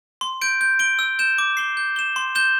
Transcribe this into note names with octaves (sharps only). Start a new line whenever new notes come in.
C6
G6 D7
G6
D7 G7
E6
G6 E7
D6
C7 G7
G6
E7 G7
C6
G6 E7 G7